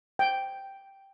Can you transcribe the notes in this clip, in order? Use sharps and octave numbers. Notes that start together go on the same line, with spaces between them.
G5